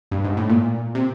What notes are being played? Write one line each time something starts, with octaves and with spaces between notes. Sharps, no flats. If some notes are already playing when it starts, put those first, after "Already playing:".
G2
G#2
A2
A#2
C3